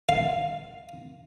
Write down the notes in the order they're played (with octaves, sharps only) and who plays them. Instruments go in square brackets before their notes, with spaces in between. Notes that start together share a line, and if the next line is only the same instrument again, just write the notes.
[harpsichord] F5